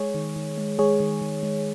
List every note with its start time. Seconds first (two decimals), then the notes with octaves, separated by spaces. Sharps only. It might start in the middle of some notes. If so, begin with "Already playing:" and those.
Already playing: G#3 G#4 C#5
0.14 D#3
0.36 D#3
0.58 G#3
0.79 G#3 G#4 C#5
1.00 D#3
1.21 D#3
1.43 G#3